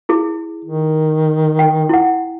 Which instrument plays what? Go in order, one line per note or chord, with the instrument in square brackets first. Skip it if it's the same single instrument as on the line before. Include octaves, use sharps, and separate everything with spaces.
[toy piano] E4 G#4
[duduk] D#3
[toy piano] G5
E4 F#5